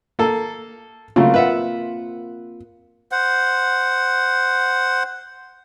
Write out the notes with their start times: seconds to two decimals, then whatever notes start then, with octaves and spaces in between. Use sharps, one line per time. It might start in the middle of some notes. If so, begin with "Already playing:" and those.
0.19 A#3 A4
1.16 C#3 F#3 A3 A#3 C4 F4
1.34 B4 E5 F#5
3.12 C5 F#5